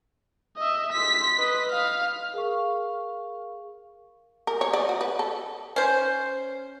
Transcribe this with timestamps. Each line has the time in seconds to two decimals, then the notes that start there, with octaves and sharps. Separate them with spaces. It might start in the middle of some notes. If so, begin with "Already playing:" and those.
0.57 D#5 E5
0.93 C6 B6
1.38 B4 D#5
1.70 F5
2.34 G#4 A#4 F5 C#6
4.47 A#4
4.61 C#5
4.73 D5
4.89 F#4
5.01 B4
5.19 A4
5.76 C#4 C5